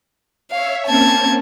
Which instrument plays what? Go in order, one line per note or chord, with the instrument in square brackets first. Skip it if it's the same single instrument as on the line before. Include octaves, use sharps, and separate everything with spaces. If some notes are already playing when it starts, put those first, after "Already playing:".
[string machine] C#5 E5 [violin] F5
[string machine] A#3 C4 C#4 [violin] A5 G#6